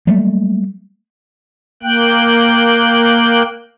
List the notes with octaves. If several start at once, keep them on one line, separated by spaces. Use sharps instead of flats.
F#3 G3 A3 A#3
A#3 G5 F#6